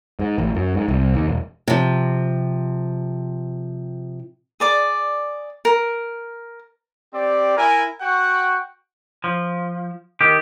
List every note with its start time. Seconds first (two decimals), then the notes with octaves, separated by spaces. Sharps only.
0.19 G#2
0.38 A1
0.55 F#2
0.74 G#2
0.88 C2
1.15 D#2
1.28 E1
1.68 C3 F3
4.60 G#4 D5 D6
5.65 A#4
7.14 C4 G4 D5
7.57 E4 A#4 G#5
8.01 F#4 F#5 G5 C#6
9.24 F3
10.21 D#3 G4